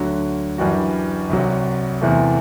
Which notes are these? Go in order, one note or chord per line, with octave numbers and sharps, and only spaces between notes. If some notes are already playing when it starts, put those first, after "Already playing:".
Already playing: D2 D3 F#3
F#2 E3 G3 D4 F#4
C2 C3 F#3
E2 C3 E3 A3